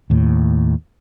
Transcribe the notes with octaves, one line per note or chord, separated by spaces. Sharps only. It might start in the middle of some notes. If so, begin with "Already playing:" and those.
D#2 A2